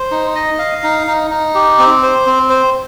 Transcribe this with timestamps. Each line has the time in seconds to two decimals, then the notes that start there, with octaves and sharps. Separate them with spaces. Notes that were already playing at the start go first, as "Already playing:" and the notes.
Already playing: C5
0.11 D#4
0.35 D#5
0.59 F5
0.83 D#4
1.07 D#4
1.31 D#4
1.55 G4
1.79 C4
2.03 C5
2.26 C4
2.50 C5